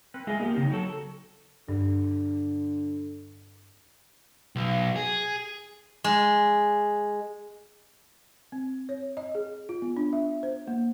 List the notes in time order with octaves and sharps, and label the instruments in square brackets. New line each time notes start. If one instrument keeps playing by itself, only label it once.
[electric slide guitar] C4 B4
G#3 F4 G#4 D#5 E5
A#3 B3 G4
C#3 C4 D#4
F#3 F#4 A4
[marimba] G2 [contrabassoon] D3
[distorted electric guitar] B1
G#4
[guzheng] G#3
[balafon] C4
C#5
D#5
G#4
F4
B3
D4
E5
C5
A#3